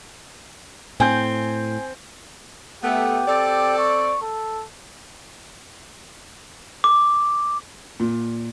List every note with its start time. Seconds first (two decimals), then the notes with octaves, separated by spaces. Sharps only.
1.00 A2 C4 G#5 G6
2.83 A3 B3 G4
3.28 C4 A4 D5
3.79 C#6
4.22 A4
6.84 D6
8.00 A#2